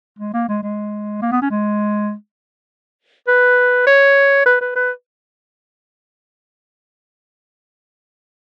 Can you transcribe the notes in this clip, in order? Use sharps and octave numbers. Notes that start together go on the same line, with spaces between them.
G#3
A#3
G#3
G#3
A#3
B3
C#4
G#3
B4
C#5
B4
B4
B4